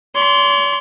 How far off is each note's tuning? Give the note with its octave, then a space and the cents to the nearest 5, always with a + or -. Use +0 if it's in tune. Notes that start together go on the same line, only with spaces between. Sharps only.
C#5 +45 C6 -5